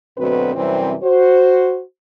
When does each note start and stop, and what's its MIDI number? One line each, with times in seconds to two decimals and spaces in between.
0.18 0.54 38
0.18 0.54 47
0.18 0.54 54
0.18 0.54 60
0.18 0.54 71
0.55 0.94 42
0.55 0.94 48
0.55 0.94 52
0.55 0.94 55
0.55 0.94 60
1.03 1.81 66
1.03 1.81 72